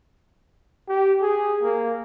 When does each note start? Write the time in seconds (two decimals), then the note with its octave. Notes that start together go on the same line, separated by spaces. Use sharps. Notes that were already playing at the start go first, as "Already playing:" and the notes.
0.89 G4
1.21 G#4
1.62 A#3